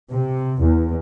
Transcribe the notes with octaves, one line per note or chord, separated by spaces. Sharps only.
C3
E2